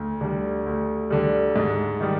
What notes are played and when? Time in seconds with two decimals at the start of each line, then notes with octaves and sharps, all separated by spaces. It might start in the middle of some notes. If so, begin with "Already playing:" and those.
Already playing: D2
0.21 D3 G3
0.66 D2
1.10 D3 G3
1.56 G#2
2.00 D#3 G3